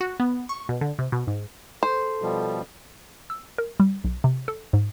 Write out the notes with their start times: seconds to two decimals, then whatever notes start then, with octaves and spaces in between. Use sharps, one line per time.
0.01 F#4
0.20 B3
0.49 C#6
0.69 B2
0.81 D3
0.99 C3
1.12 B2
1.27 G#2
1.83 A4 C5
2.22 B2 F3 G3
3.30 E6
3.58 A#4
3.80 G3
4.04 B1
4.24 C3
4.48 A4
4.73 G#2